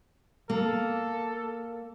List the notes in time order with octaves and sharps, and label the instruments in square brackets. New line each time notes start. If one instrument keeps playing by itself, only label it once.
[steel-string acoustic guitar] A#3 [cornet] A4